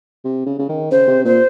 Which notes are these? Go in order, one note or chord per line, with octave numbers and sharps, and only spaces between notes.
C3
C#3
C#3
D#3
C#3 C5
C3
A#2 C5